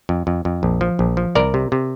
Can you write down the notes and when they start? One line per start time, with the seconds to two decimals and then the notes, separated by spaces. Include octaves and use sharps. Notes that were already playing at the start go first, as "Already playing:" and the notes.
0.09 F2
0.27 F2
0.45 F2
0.63 A#1
0.81 F3
0.99 A#1
1.17 F3
1.35 C2 A#4 D5
1.54 C3
1.72 C3